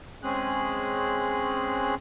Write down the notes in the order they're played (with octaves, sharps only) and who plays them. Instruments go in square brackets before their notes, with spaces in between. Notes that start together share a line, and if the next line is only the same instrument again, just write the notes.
[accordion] G#3 C4 C#4 G#4 F#6